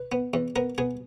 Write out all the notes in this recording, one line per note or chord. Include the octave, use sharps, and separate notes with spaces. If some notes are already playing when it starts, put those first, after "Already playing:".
Already playing: B4
B3
E2
B3 A#4
B3 G#4